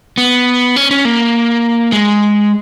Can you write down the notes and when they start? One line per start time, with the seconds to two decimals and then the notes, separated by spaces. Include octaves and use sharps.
0.18 B3
0.76 C#4
0.91 C#4
1.05 A#3
1.92 G#3